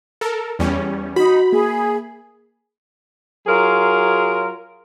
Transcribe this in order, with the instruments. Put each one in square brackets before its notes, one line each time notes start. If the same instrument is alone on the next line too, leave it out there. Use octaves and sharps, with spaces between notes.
[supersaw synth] A4 A#4
E2 G3 C#4
[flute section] D#4 [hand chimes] F#4 [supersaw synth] B5
[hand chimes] A#3 [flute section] G#4
[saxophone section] F#3 F4 G#4 A#4